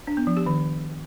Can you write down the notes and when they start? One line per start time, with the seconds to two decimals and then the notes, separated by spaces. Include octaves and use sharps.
0.07 D4
0.17 B3
0.27 F3
0.37 G4
0.46 D#3